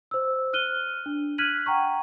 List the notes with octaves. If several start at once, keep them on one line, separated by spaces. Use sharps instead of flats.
C5 E6
F6 F#6 D#7 G7
D4
F6 F#6 G#6 B6 D#7 F#7
F#5 G5 A#5 C#6